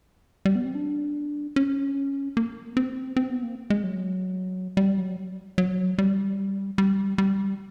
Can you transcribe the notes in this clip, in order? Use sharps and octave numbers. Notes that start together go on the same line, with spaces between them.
G3
B3
C4
D4
C#4
A#3
C4
C4
B3
A#3
G#3
F#3
G3
F#3
F#3
G3
G3
G3